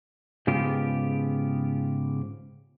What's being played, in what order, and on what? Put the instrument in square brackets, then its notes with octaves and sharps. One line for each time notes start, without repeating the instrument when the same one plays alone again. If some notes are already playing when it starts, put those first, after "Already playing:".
[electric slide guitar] G#2 C#3 B3 F4 G4